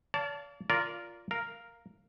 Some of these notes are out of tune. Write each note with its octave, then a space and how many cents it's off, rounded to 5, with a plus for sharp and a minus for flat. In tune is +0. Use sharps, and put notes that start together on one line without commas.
D5 -45 F5 +0 A5 +0
F4 -5 A#4 +0 D5 -20
A#4 +0 F5 +0